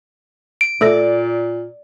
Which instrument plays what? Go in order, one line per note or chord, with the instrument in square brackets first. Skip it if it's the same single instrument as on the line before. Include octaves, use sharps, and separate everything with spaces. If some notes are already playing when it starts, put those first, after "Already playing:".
[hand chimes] D7
[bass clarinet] A#2 [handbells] A3 A4 A#6 [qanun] D5